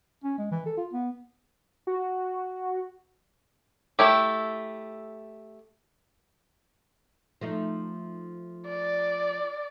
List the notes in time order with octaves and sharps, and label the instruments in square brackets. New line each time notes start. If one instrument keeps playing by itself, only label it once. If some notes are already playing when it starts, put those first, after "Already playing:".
[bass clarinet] C#4
G#3
E3
A4
F4
B3
[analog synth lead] F#4
[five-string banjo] A3 E4 G4
[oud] F3 A3 D#4
[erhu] D5